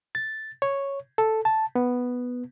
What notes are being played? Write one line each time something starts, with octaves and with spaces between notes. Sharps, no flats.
A6
C#5
A4
A5
B3